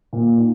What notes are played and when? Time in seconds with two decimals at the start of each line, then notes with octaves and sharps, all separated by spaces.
0.13 A#2
0.38 D#4